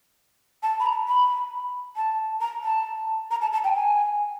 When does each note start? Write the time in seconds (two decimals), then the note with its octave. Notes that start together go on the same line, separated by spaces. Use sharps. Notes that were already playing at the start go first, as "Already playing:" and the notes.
0.63 A5
0.80 B5
0.86 A#5
1.08 B5
1.97 A5
2.41 A#5
2.63 A5
3.31 A#5
3.42 A5
3.53 A5
3.64 G5
3.75 G#5